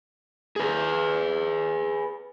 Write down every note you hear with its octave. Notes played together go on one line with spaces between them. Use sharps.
G#4 B4